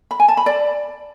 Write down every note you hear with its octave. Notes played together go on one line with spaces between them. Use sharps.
B5
G#5
A5
B5
D5